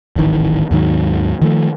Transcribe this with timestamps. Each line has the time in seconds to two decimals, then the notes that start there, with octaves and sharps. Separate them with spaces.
0.16 D1 G#1 D#3 E3
0.71 D#2 G#2 D#3 F#3
1.42 D#3 F3 A3